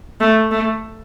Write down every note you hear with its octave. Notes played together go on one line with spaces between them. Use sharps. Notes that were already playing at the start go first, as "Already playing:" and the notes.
A3
A3